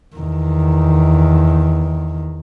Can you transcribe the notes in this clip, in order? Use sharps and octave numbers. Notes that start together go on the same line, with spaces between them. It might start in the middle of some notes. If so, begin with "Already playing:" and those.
E2 D#3